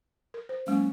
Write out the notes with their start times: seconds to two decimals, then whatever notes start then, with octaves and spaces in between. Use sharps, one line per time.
0.34 A#4
0.49 C5
0.67 F#3 G#3 A#3 C#4